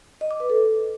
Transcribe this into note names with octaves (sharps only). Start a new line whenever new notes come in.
D#5
D6
B4
A4